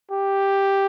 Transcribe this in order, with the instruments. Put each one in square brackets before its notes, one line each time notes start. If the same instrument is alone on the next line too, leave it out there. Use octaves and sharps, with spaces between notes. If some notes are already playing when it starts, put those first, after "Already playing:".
[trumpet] G4